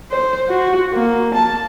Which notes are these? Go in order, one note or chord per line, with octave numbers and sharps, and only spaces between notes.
C5
F#4
A#3
A5